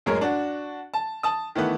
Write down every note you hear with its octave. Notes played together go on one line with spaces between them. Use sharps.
A1 F#2 G#3 A#4 C#5
D4 F#4
A5
A5 D#6
D#3 E3 A3 B3